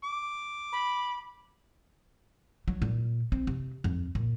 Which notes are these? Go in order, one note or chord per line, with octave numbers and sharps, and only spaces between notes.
D6
B5
F#3
A#2
C4
C3
F2
A#2